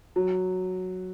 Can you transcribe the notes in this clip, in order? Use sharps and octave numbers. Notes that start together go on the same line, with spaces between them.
F#3